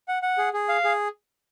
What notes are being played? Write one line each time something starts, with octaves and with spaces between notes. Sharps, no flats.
F#5
F#5
G#4
G#4
F5
G#4